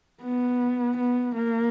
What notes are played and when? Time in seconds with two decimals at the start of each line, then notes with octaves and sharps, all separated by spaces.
0.22 B3
0.97 B3
1.35 A#3